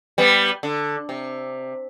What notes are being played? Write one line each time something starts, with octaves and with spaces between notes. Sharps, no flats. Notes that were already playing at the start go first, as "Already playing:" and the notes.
G3 B3
D3
C3